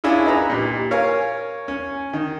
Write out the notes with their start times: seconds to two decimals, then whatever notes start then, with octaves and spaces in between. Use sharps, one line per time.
0.04 C#4 D4 E4 F4 G#4
0.26 D#4 B4 A#5 B5
0.49 A#2 G4
0.91 A#4 C#5 F5 G#5
1.68 C#4
2.13 D#3